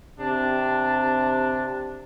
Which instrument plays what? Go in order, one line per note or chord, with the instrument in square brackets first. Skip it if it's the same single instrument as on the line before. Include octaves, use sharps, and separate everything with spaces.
[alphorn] C3 [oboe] D4